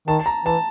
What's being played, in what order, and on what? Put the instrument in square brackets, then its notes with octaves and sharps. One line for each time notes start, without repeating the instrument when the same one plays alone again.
[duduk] D#3 [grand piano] A5
[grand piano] A5
A#5
[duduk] E3 [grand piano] A5